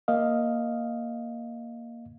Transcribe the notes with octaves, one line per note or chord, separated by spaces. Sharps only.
A#3 D#5 F5